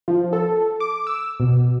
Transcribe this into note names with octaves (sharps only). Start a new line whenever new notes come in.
F3
A4
D6
E6
B2